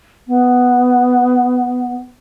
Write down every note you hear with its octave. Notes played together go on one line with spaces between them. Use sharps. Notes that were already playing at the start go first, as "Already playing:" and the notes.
B3